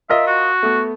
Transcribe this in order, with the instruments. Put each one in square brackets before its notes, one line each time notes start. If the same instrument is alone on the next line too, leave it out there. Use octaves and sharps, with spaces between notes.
[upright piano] F4 A#4 D#5 [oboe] E5
[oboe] F#4
[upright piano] A3 B3